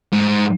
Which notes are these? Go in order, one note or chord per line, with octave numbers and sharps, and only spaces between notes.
G#2